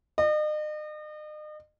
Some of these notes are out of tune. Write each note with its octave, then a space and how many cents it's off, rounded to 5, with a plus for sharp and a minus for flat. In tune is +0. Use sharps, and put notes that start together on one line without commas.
D#5 -40